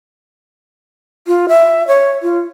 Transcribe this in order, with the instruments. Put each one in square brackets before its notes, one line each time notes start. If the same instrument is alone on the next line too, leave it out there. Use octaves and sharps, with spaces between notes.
[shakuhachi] F4
E5
C#5
F4